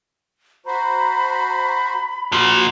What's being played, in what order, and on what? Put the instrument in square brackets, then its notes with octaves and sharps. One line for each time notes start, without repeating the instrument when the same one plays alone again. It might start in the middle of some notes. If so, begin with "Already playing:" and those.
[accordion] F#4 C5 [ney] A#5 [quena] B5
[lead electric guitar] A#2 F3 [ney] F#4